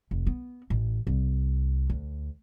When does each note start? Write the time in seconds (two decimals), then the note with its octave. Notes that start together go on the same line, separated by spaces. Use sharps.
0.11 F1
0.27 B3
0.70 A1
1.07 C2
1.90 D2